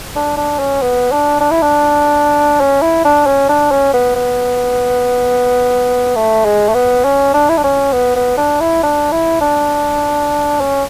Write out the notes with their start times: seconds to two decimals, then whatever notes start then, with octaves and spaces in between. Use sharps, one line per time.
0.16 D4
0.37 D4
0.59 C#4
0.82 B3
1.12 D4
1.40 D4
1.51 E4
1.62 D4
2.60 C#4
2.82 E4
3.05 D4
3.26 C#4
3.49 D4
3.71 C#4
3.93 B3
4.16 B3
6.16 A3
6.45 G#3
6.69 A3
6.74 B3
7.04 C#4
7.34 D4
7.49 E4
7.57 D4
7.64 C#4
7.93 B3
8.16 B3
8.37 D4
8.60 E4
8.83 D4
9.12 E4
9.41 D4
10.60 C#4